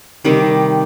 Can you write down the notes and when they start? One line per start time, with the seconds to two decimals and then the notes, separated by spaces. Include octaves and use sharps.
0.25 C3 D#3 G3